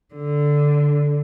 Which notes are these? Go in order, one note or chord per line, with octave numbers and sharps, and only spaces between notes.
D3